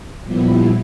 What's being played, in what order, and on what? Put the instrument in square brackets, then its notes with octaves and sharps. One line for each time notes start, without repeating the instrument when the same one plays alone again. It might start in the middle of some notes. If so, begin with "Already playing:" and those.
[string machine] A#2 F3 G3 B3 E4